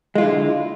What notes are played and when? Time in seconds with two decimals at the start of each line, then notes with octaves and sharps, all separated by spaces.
0.15 G#3
0.18 F4
0.21 E4
0.23 D3